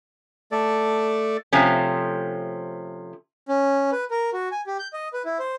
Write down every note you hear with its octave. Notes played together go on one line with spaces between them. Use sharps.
A3 A4 D5
C3 F3 A3 C#4
C#4
B4
A#4
F#4
G#5
G4
G6
D#5
B4
E4
C5